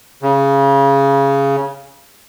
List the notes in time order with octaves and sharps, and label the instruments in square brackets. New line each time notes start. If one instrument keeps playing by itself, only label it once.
[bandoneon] C#3